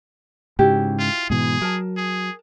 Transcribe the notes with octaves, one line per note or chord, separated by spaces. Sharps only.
G#2 C#3 E4 F#4 G4
F4
G#2 B2 E3 G#4
F#3 A#4 A5
G#4